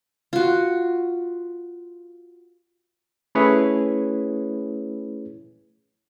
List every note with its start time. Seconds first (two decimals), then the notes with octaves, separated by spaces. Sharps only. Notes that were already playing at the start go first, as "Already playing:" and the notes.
0.33 F4 F#4
3.35 A3 C#4 E4 G#4 B4 C#5